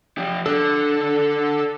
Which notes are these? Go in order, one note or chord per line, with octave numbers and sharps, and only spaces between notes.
F3 G4
D3 D4 A4